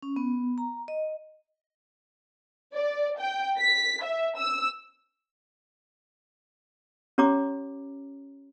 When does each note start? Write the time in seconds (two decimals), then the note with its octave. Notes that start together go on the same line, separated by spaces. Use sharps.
0.02 C#4
0.16 B3
0.58 A#5
0.88 D#5
2.74 D5
3.19 G5
3.58 B6
4.02 E5
4.37 E6
7.18 C#4 G4 C#5 A#5 D6